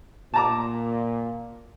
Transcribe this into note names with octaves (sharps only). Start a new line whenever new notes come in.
A#2 A5 A#5 D6